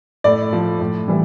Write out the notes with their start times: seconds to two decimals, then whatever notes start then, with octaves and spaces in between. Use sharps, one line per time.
0.24 A2 D5
0.53 F3
0.80 A2
1.08 E3 G3